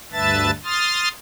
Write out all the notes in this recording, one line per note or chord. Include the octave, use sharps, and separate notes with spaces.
D2 G2 B4 E5 A5 A6
C6 D#6 F6 A6